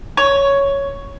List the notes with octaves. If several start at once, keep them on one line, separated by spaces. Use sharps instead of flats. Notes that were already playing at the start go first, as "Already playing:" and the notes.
C#5